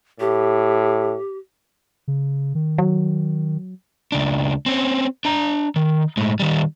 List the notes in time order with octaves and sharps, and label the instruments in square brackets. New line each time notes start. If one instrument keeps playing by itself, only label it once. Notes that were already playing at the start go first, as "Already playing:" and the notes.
[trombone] A2 [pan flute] G4
[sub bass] C#3
D#3
[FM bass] F#3
[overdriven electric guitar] C#2 D4
C4 C#4
D4 A#5
D#3
A2 G#3
D#3 G3